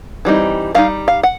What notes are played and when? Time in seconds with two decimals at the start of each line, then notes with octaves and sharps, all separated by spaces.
0.25 E3 G3 C4 D#4
0.75 G3 C4 D#4 F5
1.08 F5
1.23 F#5